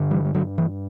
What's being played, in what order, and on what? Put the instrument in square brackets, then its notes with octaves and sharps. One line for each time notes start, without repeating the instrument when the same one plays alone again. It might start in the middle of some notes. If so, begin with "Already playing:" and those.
Already playing: [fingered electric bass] G2 D3
E3 G3
G3
D3 F#3
E3